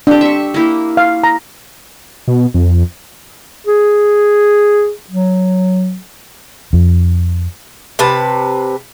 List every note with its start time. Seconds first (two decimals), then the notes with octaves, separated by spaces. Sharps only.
0.07 C4 D4 G4
0.21 E5 C#6
0.54 A#3 E4 G4
0.97 F5
1.24 A#5
2.28 B2
2.54 F2
3.67 G#4
5.10 F#3
6.73 F2
7.99 C3 B4 A5